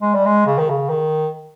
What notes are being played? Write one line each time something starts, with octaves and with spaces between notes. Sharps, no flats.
G#3
G3
G#3
C#3
D#3
C#3
D#3